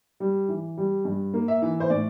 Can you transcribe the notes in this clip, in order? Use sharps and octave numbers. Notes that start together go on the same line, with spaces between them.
G3
E3
G3
G2
A#3
E5
E3
C5
A2 D5